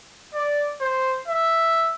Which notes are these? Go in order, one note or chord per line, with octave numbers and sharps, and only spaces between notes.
D5
C5
E5